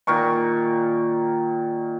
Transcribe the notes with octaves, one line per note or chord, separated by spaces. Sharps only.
A#2 D#3 A#4 C#6